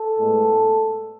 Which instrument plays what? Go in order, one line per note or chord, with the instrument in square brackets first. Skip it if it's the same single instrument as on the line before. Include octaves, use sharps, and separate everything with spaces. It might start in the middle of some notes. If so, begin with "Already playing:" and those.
Already playing: [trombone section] A4
A2 G#3 B3